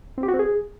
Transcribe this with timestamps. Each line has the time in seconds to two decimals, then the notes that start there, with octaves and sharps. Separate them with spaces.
0.18 C4
0.23 G4
0.28 F#4
0.34 C4
0.39 G#4